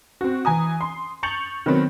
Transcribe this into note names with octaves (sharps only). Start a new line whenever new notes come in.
C4 F#4
E3 G#5 A#5 D#6
C6
C#6 G6 A6 C#7 F7 F#7
D#3 F#3 B3 C4